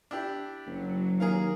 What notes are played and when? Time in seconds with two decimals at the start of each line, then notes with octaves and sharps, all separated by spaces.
0.11 D4 E4 G4
0.66 F#1 F#3
1.20 D#2 G#4 A#4 F5